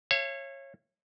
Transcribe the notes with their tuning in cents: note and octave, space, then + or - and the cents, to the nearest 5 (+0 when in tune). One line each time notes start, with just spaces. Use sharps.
C#5 -20 E5 +45 A5 +0